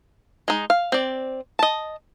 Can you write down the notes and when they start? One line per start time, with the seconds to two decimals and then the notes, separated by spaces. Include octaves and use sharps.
0.48 G#3 D#4
0.70 F5
0.92 C4 D5
1.59 D#5 A5